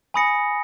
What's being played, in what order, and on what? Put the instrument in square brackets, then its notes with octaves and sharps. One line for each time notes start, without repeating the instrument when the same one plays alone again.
[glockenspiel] G#5 B5 D#6 A#6 C#7